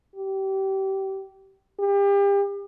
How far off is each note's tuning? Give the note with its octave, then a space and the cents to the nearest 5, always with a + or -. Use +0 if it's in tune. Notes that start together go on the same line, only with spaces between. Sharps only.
G4 -25
G4 +35